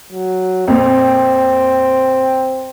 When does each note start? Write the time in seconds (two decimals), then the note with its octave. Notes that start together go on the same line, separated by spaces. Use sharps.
0.12 F#3
0.68 F2 A#2 C4